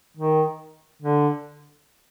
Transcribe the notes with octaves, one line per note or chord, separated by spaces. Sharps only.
D#3
D3